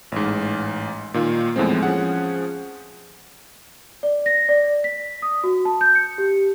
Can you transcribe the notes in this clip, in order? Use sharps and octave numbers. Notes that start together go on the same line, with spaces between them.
A1 G#2
A#2 D#3 F4
E2 A2 F3 G#3 C4
F3 C#4 G#4 F#5
D5
A#6
D5
B6
D#6
F#4
A5
G6
C#7
G4